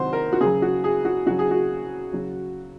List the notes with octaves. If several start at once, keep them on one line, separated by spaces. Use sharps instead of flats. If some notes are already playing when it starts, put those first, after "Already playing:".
Already playing: C3 D#3 F#3 C5 F#5
A#4
F#4
C#3 F#3 G#4
F#4
G#4
F#4
C#3 F#3 F#4
G#4
F#4
C#3 F#3